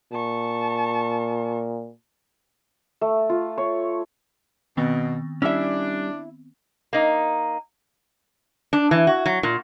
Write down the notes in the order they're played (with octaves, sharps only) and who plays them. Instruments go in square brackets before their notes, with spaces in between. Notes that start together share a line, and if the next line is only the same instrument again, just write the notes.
[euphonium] A#2 [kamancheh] A5 C#6
[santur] A3
F4
C#5
[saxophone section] B2 [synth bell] D#3 B3 C4
[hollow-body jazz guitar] G3 C#4 [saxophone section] D4 [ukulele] E4 E5
[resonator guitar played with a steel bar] A#3 D#4
D4
E3
F#4
F#3
A#2